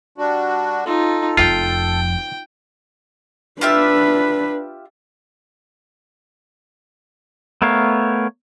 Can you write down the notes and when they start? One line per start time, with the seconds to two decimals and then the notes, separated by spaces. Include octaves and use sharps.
0.18 G3 D4 F#4
0.86 D#4 F4 A4
1.37 F1 F2 F4 G5
3.61 D4 F4 G4 B4 E5
7.62 A3 B3 A#4 C#5 F5